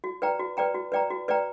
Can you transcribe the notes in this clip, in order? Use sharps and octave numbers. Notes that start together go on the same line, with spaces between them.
F#4
B4 D5 G5 A#5
F#4
B4 D5 G5 A#5
F#4
B4 D5 G5 A#5
F#4
B4 D5 G5 A#5